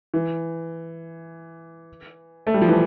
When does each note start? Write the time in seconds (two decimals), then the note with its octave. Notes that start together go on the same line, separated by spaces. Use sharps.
0.14 E3
2.47 A3
2.54 G3
2.61 F3
2.68 E3